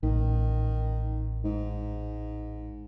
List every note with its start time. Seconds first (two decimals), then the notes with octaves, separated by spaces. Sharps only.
0.03 A1 D#3
1.44 G#2